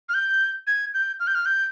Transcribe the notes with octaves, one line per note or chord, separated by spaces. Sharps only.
F6
G6
G#6
G6
F6
G6
F6
G6